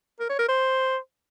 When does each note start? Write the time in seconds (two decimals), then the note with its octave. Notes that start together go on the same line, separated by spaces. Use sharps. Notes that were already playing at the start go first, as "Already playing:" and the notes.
0.20 A#4
0.29 C#5
0.39 A#4
0.48 C5